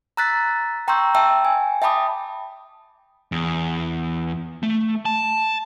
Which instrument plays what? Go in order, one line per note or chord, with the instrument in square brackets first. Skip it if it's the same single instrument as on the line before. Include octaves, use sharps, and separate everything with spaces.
[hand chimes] A#5 E6 F#6 A6 B6
G5 A#5 C6 C#6 E6 G6
E5 G5 A5 E6
G#5
E5 G5 A5 B5 D6 D#6
[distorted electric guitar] E2
A3
A5